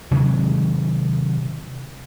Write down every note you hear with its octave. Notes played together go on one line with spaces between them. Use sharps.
C3 D#3 F#3 G#3